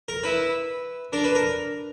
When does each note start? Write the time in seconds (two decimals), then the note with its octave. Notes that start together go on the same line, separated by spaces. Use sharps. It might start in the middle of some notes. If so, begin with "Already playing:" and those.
0.08 A#4
0.24 E4 B4
1.13 D4 A#4
1.24 B4
1.35 A#4